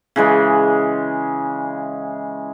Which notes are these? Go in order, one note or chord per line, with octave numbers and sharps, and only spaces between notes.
C#3 E3 G#3